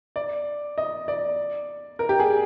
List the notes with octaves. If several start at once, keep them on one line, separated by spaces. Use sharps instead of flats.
D5
D#5
D5
A#4
G4
G#4